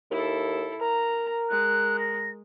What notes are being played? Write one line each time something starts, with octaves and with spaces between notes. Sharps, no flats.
D#2 E4 A4
A#4 A#5
G#3 F#6
A#6